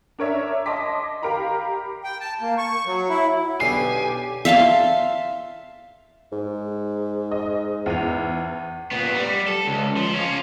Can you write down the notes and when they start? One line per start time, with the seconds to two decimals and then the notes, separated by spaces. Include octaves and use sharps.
0.19 D4 A#4 C#5 E5
0.66 D#5 A5 C6 D6 B6
1.22 G4 A#4 F5 A#5 B5
2.04 G5
2.20 A5
2.41 A#3
2.58 C#6
2.86 F#3
3.09 E4
3.60 B1 D3 G4 G#5 C7
4.45 E5 F5 A5 C6
6.32 G#2
7.32 D#5
7.86 E2 D#7 F7
8.91 A#2 B3
9.15 G3
9.48 A4
9.67 C#2
9.97 F3
10.14 C#4 F4